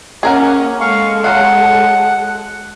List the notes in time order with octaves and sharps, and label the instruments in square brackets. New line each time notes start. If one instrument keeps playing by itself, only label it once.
[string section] A#3 C#4 [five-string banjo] G#4 A#4 F#5
[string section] G#3 A4 [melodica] F5 C#6
[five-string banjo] F#3 C4 F5 [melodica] F#5